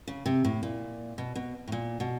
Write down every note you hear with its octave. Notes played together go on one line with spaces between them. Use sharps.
C#3
C3
A2
A#2
B2
B2
A2
A#2
B2